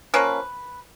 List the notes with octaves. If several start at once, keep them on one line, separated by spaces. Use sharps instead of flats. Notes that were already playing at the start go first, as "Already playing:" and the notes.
F3 A#3 C#4 B4